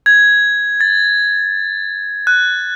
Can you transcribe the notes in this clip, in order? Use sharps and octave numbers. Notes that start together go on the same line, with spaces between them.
G#6
A6
F#6